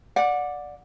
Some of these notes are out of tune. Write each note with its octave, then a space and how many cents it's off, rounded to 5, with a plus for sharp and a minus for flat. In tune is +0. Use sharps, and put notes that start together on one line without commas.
D5 +0 F#5 -25